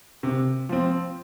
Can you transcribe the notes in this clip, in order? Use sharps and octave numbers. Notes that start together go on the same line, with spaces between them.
C3
F3 C4